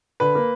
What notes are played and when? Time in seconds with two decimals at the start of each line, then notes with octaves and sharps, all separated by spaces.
0.20 D3 B4
0.35 A#3